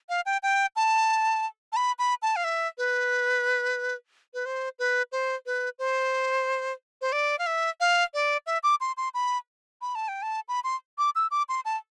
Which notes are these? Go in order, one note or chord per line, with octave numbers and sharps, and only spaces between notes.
F5
G5
G5
A5
A5
B5
B5
A5
F5
E5
B4
B4
C5
B4
C5
B4
C5
C5
D5
F5
E5
F5
D5
E5
D6
C6
C6
B5
B5
A5
G5
A5
B5
C6
D6
E6
D6
C6
A5